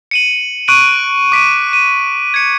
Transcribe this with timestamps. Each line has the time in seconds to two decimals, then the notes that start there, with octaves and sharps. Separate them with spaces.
0.11 C#7 D#7 F#7
0.68 C#6 F#6 D7 D#7 F#7
1.32 D6 B6 D7 D#7
1.73 D#7
2.34 G#6 C#7